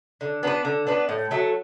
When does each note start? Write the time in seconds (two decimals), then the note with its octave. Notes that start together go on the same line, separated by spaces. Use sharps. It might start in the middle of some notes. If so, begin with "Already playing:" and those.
0.21 D3
0.43 B3 D4 B4
0.65 D3
0.87 B3 D4 B4
1.09 A2
1.31 F#3 A3